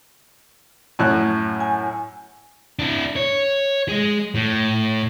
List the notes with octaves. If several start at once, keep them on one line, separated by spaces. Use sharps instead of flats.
F#2 A2 F#6
G#5
D4 E4
C#5
G#3 G#4
A2